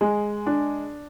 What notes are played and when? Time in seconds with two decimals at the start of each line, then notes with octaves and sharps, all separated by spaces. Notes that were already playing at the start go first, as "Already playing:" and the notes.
0.01 G#3
0.47 D4